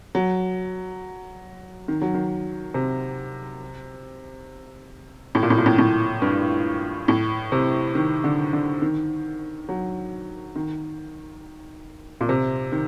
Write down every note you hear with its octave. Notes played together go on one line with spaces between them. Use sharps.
F#3
D#3
F#3
D#3
C3
A2
A#2
A2
A#2
A2
A2
G2
A2
C3
D#3
D3
D3
D#3
F#3
D#3
A#2
C3
D#3